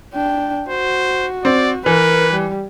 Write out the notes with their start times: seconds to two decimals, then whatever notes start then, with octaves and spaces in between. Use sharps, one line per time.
0.14 D4 G5
0.69 F#4 C5
1.45 C4 D5
1.86 E3 A#4 B4
2.33 G3